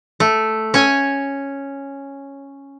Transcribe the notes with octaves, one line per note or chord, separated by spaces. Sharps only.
A3
C#4 C#5 G#5